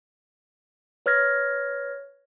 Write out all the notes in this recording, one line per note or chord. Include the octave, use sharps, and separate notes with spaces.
B4 C#5 F6 G#6 A#6